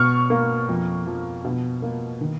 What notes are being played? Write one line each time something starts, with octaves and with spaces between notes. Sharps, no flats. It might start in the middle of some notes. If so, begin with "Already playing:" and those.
Already playing: B2 C#6 F6
A#3
F2
F3
B2
A#3
D#3